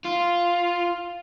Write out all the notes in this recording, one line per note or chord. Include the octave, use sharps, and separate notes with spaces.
F4